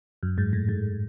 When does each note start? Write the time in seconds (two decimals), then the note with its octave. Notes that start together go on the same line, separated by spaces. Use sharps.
0.23 F#2
0.38 G#2
0.53 A2
0.69 G#2